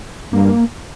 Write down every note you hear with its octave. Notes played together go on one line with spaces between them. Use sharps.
G2 A#3